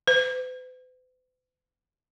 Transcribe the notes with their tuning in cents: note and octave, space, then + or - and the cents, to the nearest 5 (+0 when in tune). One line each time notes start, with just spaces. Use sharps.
B4 +45